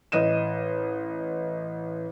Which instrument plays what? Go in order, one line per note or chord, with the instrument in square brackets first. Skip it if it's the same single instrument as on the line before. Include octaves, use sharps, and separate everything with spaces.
[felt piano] A1 D#5 D#7 E7